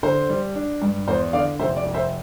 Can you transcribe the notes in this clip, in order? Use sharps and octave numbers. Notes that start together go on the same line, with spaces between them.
D3 C5
G3
D4
G2
E2 C5
D3 D5 F5
F1 C5 E5
D5
F1
C5 E5